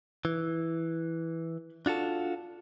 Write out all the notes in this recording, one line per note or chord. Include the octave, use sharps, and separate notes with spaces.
E3
D4 F4 F#4 A4